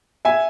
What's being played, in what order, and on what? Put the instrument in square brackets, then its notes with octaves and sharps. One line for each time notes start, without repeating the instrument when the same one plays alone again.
[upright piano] E5 G#5